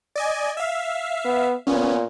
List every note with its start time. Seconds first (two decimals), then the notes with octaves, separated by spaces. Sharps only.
0.16 D5 D#5 G#5
0.57 E5 F5
1.25 B3
1.67 A#2 B3 C#4